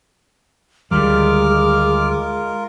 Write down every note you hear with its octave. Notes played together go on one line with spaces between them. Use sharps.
D2 D#3 G3 G#3 F4 A#4 D6 F6